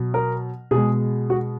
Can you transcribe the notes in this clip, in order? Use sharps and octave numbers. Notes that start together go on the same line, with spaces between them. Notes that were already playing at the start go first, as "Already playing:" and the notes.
Already playing: B2 F#3
A#4
B2 G#3 G#4
F#4